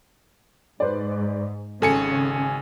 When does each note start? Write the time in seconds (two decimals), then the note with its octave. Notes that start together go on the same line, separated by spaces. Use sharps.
0.80 G#2 B4 C5 D5
1.82 G#1 C#3 A4 G#5 C#7